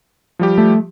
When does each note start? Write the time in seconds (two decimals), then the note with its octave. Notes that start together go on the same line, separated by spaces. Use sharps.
0.39 F3 G3 G4
0.58 A3